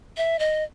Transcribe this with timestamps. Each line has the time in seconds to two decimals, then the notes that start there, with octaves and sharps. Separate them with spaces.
0.17 E5
0.39 D#5